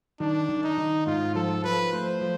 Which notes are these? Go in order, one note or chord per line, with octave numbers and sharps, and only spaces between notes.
D#3 D4
D#3
D#4
D#3
G#2 F4
F3 A4
F3 B4
A3 C5
F3